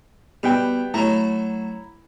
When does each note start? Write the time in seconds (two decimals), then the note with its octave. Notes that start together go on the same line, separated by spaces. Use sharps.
0.43 B2 G3 B3 G5
0.94 F#3 A3 E4 A#5